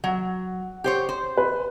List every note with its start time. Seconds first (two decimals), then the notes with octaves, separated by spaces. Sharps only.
0.04 F#3 F#5
0.84 G4 C5 C#5
1.09 C5
1.37 B4